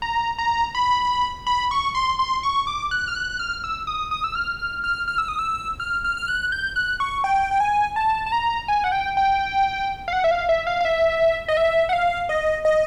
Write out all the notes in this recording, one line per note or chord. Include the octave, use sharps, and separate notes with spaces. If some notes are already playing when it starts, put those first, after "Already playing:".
A#5
A#5
B5
B5
C#6
C6
C6
C#6
D6
F#6
F6
F#6
F#6
F6
E6
D#6
D#6
E6
F6
F6
F6
F6
E6
D#6
E6
F6
F6
F6
F#6
G6
F#6
C#6
G5
G5
G#5
A5
A5
A#5
G#5
F#5
G5
G5
F5
F#5
E5
F5
E5
F5
F5
E5
D#5
E5
F#5
F5
D#5
D#5